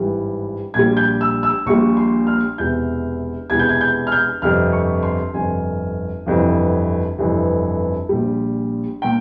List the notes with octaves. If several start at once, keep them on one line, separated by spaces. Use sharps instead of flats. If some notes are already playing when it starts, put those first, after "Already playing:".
Already playing: G#1 G2 E3 G3
A#1 A#2 G3 G#6
G6
E6
E6
A#1 A#2 G3 C#6
C6
F6
E1 E2 C3 G6
E1 E2 C3 G#6
G6
G#6
G6
F6
G6
G1 F2 C3 F6
C#6
C6
G1 F2 C3 G#5
G1 F2 C3 E3
G1 F2 C3 E3
A#1 A#2 G3
A#2 G5